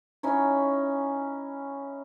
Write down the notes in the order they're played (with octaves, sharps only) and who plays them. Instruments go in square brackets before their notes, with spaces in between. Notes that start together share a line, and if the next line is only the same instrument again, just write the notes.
[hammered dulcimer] C#4 D#4 E4 C#5